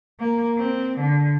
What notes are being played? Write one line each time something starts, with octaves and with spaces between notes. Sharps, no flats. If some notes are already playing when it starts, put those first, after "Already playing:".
A#3
C4
D3